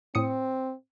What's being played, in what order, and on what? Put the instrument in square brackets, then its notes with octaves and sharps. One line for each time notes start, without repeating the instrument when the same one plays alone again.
[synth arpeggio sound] A2 D#6 C#7 [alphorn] C4